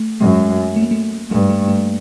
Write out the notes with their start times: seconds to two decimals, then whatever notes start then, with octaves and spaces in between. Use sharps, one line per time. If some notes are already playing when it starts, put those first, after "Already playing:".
Already playing: A3
0.20 F#2 G#3
0.76 A3
0.83 A#3
0.91 A3
1.31 G2 A3
1.49 A3
1.68 A3